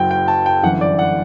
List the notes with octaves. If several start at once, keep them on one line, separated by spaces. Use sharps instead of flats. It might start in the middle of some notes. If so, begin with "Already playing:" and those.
Already playing: F#1 F#2 F#3 G5
G5
A5
G5
G1 F#2 E3 F#5
D5
F#5